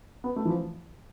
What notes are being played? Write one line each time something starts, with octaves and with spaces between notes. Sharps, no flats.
B3
A3
E3
F3